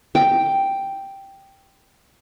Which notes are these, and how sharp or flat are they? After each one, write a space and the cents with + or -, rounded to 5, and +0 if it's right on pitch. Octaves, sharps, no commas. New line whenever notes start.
G5 +0